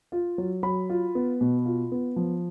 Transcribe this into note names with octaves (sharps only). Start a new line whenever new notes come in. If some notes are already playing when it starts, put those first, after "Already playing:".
F4
F#3
F#3 B5
F4
B3
B2
F4
B3
F3